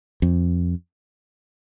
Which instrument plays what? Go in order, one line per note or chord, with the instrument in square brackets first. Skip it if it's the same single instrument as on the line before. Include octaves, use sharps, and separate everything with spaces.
[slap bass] F2